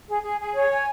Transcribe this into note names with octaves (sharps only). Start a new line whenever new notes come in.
G#4
G#4
G#4
C#5
G#5